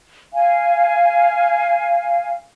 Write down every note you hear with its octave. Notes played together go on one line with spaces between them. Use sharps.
F5 G#5